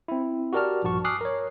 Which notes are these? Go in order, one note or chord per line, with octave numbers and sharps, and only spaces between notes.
C4 E4
F#4 G4 A#4 D5 A5 F6
A#1 G2 F3 F#4 A5 C#6
G#5 D6 D#6 F6 F#6 C7
A#4 C#5